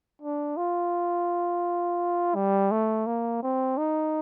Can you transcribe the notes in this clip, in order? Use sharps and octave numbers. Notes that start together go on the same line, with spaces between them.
D4
F4
G3
A3
A#3
C4
D#4